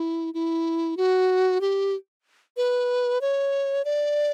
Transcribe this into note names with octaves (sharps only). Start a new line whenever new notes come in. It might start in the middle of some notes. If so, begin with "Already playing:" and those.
Already playing: E4
E4
F#4
G4
B4
C#5
D5